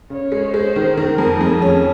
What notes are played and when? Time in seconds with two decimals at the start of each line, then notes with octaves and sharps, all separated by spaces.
0.10 C#3 C#5
0.32 G#3
0.53 G#3 C5
0.76 D#3
0.97 D#3 A#4
1.18 F2
1.41 F2 G#4
1.62 C#4